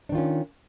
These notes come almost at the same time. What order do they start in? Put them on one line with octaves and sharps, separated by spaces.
D4 D#3 F4 C#4